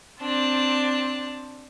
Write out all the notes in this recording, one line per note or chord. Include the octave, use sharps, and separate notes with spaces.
C4 D4 A5